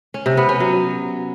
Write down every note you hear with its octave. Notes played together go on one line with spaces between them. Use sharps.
C#4
C3
B3
C#4
F#3